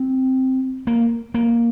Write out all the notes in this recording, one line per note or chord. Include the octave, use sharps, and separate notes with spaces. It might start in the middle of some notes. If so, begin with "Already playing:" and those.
Already playing: C4
A#3
A#3